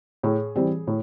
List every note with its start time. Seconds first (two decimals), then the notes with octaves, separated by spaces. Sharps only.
0.23 A2 G#4
0.56 E3 G3 C4
0.87 A2